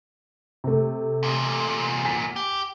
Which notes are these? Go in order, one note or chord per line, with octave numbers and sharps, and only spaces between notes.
C3 A3
E2 A#2
G#5 B6
G4